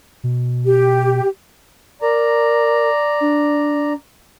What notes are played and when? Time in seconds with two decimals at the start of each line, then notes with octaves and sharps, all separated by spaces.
0.24 B2
0.66 G4
2.02 A#4 D5 A#5
3.21 D4